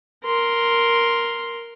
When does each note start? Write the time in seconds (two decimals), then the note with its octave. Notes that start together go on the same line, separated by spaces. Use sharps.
0.25 A#4 C6